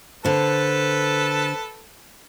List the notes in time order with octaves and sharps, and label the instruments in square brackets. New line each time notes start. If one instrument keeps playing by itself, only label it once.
[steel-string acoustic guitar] D3 C5 [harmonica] A4 B4 A5